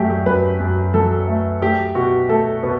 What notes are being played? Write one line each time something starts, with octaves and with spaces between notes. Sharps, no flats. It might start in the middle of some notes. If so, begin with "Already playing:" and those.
Already playing: F#2 F#3 A3 G4
G4
F#2 B4
F#2
F#3 A4
A3
A3 G4
B2 F#4
A3 A4
B2 B4